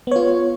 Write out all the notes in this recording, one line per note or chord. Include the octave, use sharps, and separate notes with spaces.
B3 F4 C#5